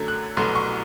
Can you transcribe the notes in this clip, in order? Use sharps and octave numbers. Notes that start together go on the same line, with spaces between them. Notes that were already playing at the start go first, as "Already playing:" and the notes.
Already playing: F#2 D3 F#3 A3
F#6
C2 B2 F#3 A3 C6
C#6